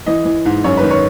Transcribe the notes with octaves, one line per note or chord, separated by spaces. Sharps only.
E3 D#5
E3
G#2
F#2 C#5
B4
D#3
C#5